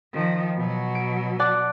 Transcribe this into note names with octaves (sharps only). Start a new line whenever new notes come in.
D#3 F3
B2 F#3
D7
D5 F#5 A5